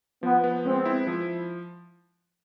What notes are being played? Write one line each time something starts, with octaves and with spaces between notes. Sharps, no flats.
F3 B3
B3
G#3 C4
E4
F3